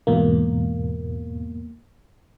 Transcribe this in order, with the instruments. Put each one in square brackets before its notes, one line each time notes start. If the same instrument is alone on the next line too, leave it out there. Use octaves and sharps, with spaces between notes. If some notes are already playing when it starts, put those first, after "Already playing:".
[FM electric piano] E2 G#2 B2 A#3